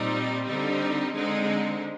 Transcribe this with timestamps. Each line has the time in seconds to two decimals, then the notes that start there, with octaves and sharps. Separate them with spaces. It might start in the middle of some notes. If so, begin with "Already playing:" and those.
Already playing: A#2 G3 C4 D#4
0.47 D3 G3 C4 D#4
1.13 D3 G#3 C4 D#4